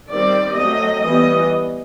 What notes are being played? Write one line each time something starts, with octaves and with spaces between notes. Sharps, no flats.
D#3 G3 C4 D5
F#3 A3 C4 D#5
E3 G3 B3 D#5